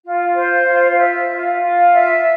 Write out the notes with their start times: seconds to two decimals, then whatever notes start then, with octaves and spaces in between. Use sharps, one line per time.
0.04 F4
0.35 C5
0.66 F4
0.97 E5
1.29 F4
1.60 F4
1.92 E5